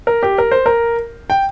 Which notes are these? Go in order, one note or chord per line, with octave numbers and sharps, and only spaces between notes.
A#4
G4
A#4
C5
A#4
G5